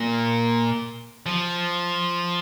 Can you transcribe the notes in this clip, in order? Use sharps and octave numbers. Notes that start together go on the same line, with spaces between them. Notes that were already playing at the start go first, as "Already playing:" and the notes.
Already playing: A#2
F3